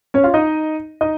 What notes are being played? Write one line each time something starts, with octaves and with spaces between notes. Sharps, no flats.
C#4 C#5
F4 F5
D#4 D#5
D#4 D#5